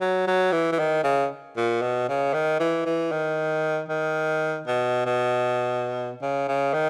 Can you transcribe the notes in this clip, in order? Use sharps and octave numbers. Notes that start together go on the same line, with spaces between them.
F#3
F#3
E3
E3
D#3
C#3
A#2
B2
C#3
D#3
E3
E3
D#3
D#3
B2
B2
C#3
C#3
D#3